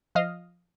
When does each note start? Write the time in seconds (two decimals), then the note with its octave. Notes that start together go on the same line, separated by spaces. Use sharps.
0.15 F3 D#5 F5